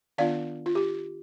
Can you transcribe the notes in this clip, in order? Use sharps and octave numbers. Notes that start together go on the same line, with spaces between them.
D#3 B3 D4 F4 D5 F5
F4
G4